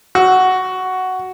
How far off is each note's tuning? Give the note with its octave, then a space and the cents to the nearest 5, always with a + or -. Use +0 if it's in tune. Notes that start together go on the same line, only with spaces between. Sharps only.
F#4 +5